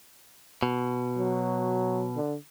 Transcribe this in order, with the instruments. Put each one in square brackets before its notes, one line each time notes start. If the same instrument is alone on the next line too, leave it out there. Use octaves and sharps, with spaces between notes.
[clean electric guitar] B2
[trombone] F#3
D3